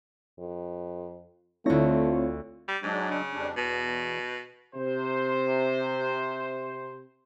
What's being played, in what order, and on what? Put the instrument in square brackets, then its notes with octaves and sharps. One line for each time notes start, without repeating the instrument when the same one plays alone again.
[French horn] F2
[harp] D2 A#6 [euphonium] A3 [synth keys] C4 E4 C#5 [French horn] F4
[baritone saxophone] G3
[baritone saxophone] G#2 [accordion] F#3 G#3 D4
[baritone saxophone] C#3
[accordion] F2 G3 D4
[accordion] E2 [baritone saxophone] B2
[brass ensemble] C3 C5